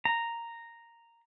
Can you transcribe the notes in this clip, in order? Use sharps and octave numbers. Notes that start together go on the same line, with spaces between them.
A#5